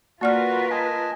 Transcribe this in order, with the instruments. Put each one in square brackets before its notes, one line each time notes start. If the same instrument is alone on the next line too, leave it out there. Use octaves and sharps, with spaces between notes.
[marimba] A#3 D5 F6 [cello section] F4 A#4 B4 [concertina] F#4
[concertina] D#5 G#5 A5